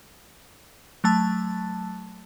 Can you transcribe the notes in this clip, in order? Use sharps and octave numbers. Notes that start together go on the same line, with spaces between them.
F#3 A3 A5